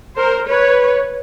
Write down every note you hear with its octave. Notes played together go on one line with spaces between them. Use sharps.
A#4 C5
B4 C#5